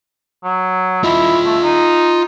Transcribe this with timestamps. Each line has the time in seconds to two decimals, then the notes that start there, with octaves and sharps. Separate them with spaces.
0.44 F#3
1.04 E4 F4 D#5
1.45 A3
1.63 D#4